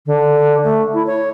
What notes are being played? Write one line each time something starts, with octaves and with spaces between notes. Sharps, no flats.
D3
A3
E4
C#5